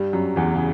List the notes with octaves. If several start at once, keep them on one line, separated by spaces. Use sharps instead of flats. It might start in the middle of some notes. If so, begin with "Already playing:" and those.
Already playing: G2 G3
F#2 F#3
E2 E3
C#3